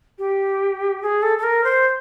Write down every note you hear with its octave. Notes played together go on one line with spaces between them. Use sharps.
G4
G#4
A4
A4
A#4
C5